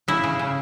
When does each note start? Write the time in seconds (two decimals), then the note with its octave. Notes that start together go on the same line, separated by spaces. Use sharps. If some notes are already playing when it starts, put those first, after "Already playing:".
0.08 C#3 E4
0.24 C#3
0.39 C#3